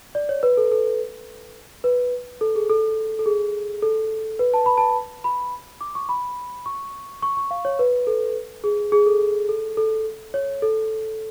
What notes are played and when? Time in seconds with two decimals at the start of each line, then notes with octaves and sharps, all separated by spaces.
0.15 D5
0.29 C#5
0.43 B4
0.57 A4
0.72 A4
1.84 B4
2.41 A4
2.55 G#4
2.70 A4
3.19 A4
3.26 G#4
3.82 A4
4.39 B4
4.54 A5
4.66 B5
4.78 A5
5.24 B5
5.81 D6
5.95 C#6
6.09 B5
6.66 C#6
7.22 C#6
7.37 C#6
7.51 F5
7.65 C#5
7.79 B4
8.07 A4
8.64 G#4
8.92 G#4
9.06 A4
9.49 A4
9.77 A4
10.34 C#5
10.62 A4